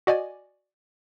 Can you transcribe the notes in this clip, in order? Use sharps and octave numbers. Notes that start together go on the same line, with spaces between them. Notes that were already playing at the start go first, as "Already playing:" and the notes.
F#4 D5 D#5 G#5